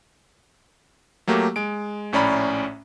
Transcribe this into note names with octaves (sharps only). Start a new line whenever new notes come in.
F#3 A3 A#3 G4
G#3 D7
A#1 A2 C#4 D5 A#5 B5